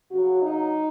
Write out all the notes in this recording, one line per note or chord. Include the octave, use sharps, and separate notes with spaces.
C#3 F#3 F#4
D#4